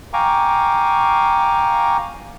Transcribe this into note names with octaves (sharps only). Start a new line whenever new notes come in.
F5 G5 G#5 A#5 C#6 D6